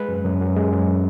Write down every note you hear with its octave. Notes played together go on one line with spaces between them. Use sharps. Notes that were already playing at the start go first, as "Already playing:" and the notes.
Already playing: G#3 B4
F#2
F#2
F#2
G#3
F#2